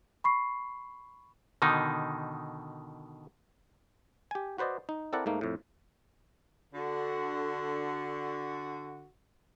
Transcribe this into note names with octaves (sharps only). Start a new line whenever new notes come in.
B5 C#6 C7
B2 D3 D#3 D#4
G4 G#5
F#4 B4 C5 D5 D#5
D#4
C4 E4 A4 A#4 D5 F#5
G#2 A3 A#3 D#4
F2 A2
D3 F#4